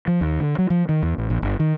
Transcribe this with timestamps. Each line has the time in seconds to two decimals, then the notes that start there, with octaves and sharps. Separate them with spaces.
0.08 F3
0.21 D#2
0.40 D3
0.58 F#3
0.70 F3
0.89 D#3
1.03 E2
1.18 A1
1.30 A#1
1.42 G1
1.60 D#3